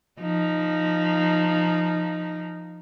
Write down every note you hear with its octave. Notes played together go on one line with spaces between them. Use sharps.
F3 D#4